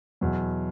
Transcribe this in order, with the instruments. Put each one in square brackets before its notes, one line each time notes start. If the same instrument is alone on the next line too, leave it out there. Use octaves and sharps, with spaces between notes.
[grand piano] E2 B2 F#3